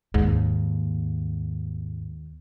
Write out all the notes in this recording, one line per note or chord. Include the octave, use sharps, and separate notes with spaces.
D#2 G#2